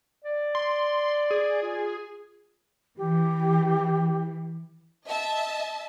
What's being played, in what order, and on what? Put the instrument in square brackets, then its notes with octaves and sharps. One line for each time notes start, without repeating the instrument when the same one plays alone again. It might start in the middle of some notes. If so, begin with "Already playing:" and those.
[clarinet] D5
[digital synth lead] C6
G#4
[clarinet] F4
[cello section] E3 [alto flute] G4
[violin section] D#5 E5 A5